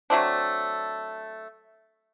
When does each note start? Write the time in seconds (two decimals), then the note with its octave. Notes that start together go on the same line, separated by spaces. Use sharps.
0.10 F#3 A3 C4 D4